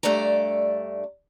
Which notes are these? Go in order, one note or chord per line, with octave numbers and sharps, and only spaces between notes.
G2 A3 D4 D5 A#5